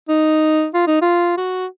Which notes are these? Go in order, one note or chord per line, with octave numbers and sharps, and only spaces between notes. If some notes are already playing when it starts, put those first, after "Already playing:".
D#4
F4
D#4
F4
F#4